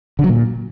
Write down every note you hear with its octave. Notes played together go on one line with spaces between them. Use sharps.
D3
F#3
A#2